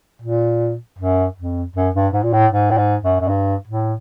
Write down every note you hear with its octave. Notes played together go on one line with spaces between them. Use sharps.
A#2
F#2
F2
F#2
G2
G#2
A#2
A2
G#2
A2
G#2
F#2
F#2
G2
A2